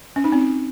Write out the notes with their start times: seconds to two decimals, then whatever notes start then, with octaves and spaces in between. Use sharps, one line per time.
0.16 C#4
0.24 D#4
0.32 C4